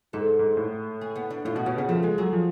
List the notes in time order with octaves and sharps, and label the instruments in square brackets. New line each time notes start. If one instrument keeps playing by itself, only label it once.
[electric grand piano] G#2 [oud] A4
[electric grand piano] G#2
A2
[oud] G#4
B3
D4
[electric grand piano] A2 [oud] F4
[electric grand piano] B2 [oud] F#4
[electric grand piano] B2 [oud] C#4
[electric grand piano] C#3 [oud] B3
[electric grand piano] F3 [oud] A3
[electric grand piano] G#3 [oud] G#4
[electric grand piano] F#3 [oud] G#4
[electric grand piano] F3